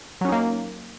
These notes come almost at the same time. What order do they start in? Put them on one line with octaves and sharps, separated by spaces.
F#3 C#4 D#4 A#3